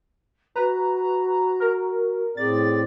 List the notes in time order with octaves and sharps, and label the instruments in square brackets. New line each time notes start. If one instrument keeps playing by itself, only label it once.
[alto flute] F#4 [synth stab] B4 [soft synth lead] A#5
[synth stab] A#4
[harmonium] A2 C4 D5 [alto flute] G#4 [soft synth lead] A6